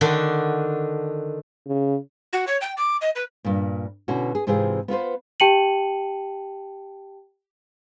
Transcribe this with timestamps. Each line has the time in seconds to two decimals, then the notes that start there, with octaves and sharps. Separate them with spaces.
0.01 D3 D#3 D4 F#4
1.67 C#3
2.33 F#4
2.47 C#5
2.61 G5
2.77 D6
3.01 D#5
3.15 B4
3.45 G2 A#2
4.08 B2 D3 C#4 E4 F#4
4.35 G#4
4.47 G#2 C3 E3 C4 F4 G#4
4.88 B3 F4 B4 C5
5.40 G4 G5 A5 C#7 D#7 F#7